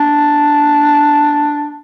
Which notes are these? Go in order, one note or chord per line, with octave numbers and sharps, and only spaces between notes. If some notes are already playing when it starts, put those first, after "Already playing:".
Already playing: D4